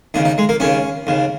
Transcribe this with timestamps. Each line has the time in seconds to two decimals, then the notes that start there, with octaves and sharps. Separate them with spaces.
0.14 D#2 C#3 D#4
0.25 D#4
0.38 G#3
0.49 A#3
0.60 D#2 C#3 C#4
1.07 D#2 C#3